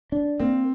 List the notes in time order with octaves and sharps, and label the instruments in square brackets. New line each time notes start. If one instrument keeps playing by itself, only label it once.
[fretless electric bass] D4
[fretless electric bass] A#3 [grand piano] C4